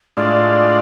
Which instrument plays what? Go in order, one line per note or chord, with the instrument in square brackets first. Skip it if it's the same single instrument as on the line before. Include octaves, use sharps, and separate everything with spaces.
[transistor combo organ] A2 G#3 D4 F4 [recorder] D5